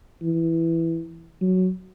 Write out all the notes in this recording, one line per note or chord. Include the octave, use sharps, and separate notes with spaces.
E3
F#3